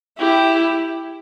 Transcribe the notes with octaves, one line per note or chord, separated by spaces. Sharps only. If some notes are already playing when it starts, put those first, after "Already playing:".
E4 G4